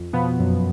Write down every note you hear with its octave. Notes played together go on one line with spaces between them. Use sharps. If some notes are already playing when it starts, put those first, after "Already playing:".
Already playing: F2
B2 F3 B3
F#2